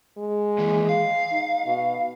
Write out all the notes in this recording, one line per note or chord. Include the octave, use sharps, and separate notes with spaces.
G#3
D#2 E3
F5
D#4
B2